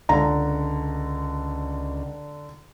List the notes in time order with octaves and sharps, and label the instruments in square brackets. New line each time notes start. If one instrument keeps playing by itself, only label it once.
[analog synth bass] C#2 [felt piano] D3 A#5